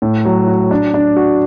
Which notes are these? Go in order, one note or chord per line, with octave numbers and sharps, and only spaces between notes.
A2
F#3
F#4
D4
D4
F#4